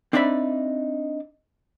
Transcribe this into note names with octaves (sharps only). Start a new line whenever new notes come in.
C4 D4 D#4 D5 E5 B5